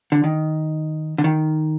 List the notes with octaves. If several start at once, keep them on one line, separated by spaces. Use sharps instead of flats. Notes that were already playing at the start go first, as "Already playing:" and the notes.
D3
D#3
D3
D#3